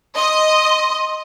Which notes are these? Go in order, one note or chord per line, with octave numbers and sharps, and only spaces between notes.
D#5 C6